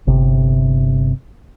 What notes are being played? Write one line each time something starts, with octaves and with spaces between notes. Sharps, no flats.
G1 C3